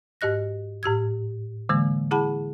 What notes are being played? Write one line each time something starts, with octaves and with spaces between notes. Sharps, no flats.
G#2 G4 D#5 F#6 A#6
A2 G4 E6 G#6
D3 E3 G#3 A#3
E4 G#4 F#5 A5 B5